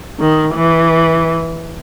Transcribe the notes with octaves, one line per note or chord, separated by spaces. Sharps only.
D#3
E3